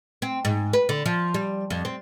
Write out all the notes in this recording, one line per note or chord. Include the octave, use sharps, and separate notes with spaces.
C4
G#2
B4
D3
F3
G3
F2
C4